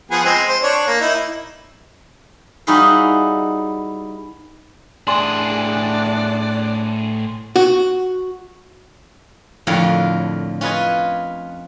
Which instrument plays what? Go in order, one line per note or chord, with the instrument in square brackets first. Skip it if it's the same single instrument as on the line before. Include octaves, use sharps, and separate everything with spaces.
[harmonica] F3 B3 G#4
G#3 C4
C5
D4 C#5
A#3
D#4 E4
[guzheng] G3 D#4 E4 F#4 G#4 F5
[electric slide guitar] A2 G#4 [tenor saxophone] D4 [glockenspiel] G#5 C6 F#7
[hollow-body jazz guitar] F#4
[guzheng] F2 A2 D3 F4 A#4 C#5
C#4 F4 B4 D#5 G#5